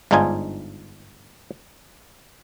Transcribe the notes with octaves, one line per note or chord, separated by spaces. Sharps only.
G1 G#2 D4 D#4 F4 G#5